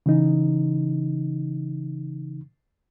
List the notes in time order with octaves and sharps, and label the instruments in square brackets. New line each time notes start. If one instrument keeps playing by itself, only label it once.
[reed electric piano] C#3 E3 D#4